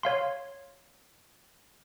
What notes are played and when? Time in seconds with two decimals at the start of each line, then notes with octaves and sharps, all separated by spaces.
0.03 C#5 F5 C6